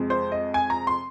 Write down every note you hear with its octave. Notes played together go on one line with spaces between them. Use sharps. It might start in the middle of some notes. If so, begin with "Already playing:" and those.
Already playing: F2 C3 G#3
C5
D#5
G#5
A#5
C6